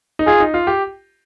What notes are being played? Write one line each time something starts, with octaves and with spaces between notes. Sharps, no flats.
D#4
F4 G#4
D#4
F4
G4